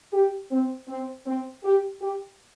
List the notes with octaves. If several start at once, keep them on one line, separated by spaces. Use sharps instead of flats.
G4
C4
C4
C4
G4
G4